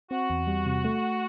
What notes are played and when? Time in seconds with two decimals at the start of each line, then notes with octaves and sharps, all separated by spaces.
0.11 C4 F#4
0.30 E2
0.47 G3
0.66 C3
0.84 A3